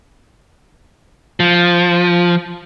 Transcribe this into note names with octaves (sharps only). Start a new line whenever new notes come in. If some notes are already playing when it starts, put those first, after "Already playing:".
F3